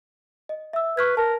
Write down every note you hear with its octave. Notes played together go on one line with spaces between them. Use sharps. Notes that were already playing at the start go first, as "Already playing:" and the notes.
D#5
E5 E6
B4 C#6 F6 G#6
A#4 A5